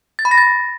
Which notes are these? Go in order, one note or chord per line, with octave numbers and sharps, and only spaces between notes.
A6
B5
A#6
A6